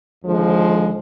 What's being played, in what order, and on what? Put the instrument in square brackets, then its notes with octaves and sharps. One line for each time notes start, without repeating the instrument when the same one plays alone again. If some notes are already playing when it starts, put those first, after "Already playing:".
[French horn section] D#2 D3 F3 G#3